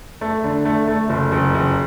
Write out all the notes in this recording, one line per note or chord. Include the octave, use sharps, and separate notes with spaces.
A3
D3
A3
A3
F#1
F#1
F#1